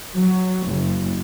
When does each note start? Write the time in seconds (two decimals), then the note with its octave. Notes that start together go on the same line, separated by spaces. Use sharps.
0.16 F#3
0.67 F#1